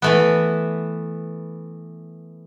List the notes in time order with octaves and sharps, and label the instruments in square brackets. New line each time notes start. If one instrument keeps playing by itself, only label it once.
[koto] E3 A3 B3